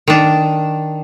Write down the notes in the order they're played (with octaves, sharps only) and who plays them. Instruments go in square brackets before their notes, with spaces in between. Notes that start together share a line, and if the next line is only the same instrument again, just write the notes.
[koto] D#3 D4